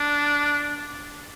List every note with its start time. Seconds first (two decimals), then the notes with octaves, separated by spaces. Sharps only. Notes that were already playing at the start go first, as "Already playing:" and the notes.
Already playing: D4